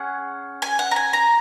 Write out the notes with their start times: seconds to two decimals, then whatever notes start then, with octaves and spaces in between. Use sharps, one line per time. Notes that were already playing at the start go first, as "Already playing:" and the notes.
Already playing: C#4 G#4 F#5
0.62 G#5
0.79 F#5
0.91 A#5
0.96 G#5
1.13 A#5